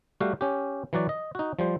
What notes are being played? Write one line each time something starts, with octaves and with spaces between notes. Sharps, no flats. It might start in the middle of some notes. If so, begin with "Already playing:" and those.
G3 A3 F#4 G4 F5
C#4 G4
E3 F#3 F#4 D5
D#5
D#4 F#4
F3 G3 C5